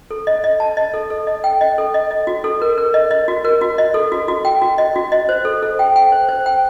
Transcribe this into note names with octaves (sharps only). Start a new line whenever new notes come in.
A4
D#5
D#5
A5
D#5
A4
A4
D#5
G5
D#5
A4
D#5
D#5
F#4
A4
A#4
A#4
D#5
D#5
F#4
A#4
F#4
D#5
A4
F#4
F#4
G5
F#4
D#5
F#4
D#5
C5
A4
A4
G5
G5
C5
C5
G5